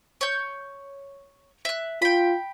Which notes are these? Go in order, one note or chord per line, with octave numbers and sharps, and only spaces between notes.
C#5 G6
E5 F#6
F4 G5 B5